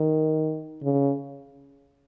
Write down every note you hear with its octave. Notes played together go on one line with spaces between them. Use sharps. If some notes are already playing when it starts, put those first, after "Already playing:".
Already playing: D#3
C#3